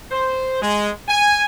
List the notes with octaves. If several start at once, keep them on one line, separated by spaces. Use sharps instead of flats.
C5
G#3
G#5